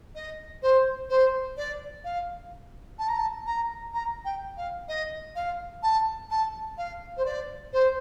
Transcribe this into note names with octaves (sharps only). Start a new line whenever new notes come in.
D#5
C5
C5
D5
F5
A5
A#5
A5
A#5
A#5
G5
F5
D#5
F5
A5
A5
F5
C5
D5
C5